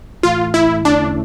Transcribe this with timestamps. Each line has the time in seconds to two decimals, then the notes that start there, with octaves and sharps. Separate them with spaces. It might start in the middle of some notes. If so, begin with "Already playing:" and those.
0.23 A2 E3 A3 F4
0.54 E4
0.85 E2 D3 A3 C#4 D4 E4